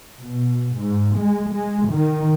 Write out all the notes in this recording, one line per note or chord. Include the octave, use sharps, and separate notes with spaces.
B2
G#2
G#3
G#3
D#3